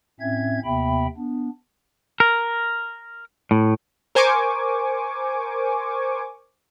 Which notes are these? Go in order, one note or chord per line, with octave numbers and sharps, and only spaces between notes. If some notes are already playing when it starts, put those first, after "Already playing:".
A2 C4 C#4 E5 G#6
D#2 C3 B3 E5 G5 B5
B3 D4
A#4
A2
A#4 C5 G#5 C#6 D6